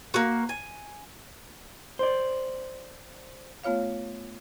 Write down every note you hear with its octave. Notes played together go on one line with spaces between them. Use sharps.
A#3 F#4
G#5
C5 D5
A3 B3 F4 C#5 F5